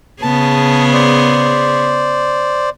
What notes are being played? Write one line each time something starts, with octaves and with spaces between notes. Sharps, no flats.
C#3 B3 G#4 A5
C5 D5